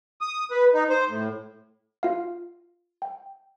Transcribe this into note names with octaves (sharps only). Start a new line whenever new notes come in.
D#6
B4
D#4
C5
A2
F4 F5
G5